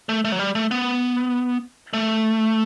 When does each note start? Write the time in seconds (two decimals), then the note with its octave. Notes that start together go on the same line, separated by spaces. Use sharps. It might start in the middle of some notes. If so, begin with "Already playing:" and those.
0.09 A3
0.25 A3
0.32 F#3
0.39 G3
0.55 A3
0.71 B3
1.93 A3